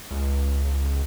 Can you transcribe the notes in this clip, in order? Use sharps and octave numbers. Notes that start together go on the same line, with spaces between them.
C#2